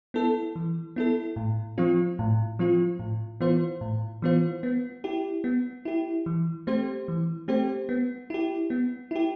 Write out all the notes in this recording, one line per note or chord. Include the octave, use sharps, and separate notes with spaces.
B3 E4 A4
E3
B3 E4 A4
A2
F3 C4 F4
A2
F3 C4 F4
A2
E3 B3 F4 C5
A2
E3 B3 F4 C5
B3
E4 G4
B3
E4 G4
E3
A3 C4 G4 C5
E3
A3 C4 G4 C5
B3
E4 G4
B3
E4 G4